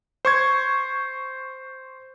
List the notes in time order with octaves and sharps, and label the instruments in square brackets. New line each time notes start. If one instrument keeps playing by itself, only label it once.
[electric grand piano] C5 C#6 G#6